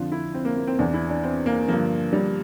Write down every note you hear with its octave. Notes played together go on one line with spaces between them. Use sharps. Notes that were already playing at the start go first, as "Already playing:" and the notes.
Already playing: F2 D3 F3 F4
E4
C4
A#3
A#3
C4
E2 E3 D4
E4
D4
C4
A#3
G2 D3 F3 A#3
G3